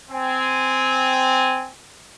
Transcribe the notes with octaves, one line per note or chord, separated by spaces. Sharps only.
C4 G#5